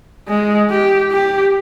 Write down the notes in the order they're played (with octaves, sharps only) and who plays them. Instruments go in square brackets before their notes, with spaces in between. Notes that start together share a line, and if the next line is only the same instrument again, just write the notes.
[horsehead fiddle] G#3
G4
G4